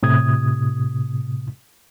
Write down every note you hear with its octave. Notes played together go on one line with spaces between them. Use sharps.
A2 C3 D#6 G#6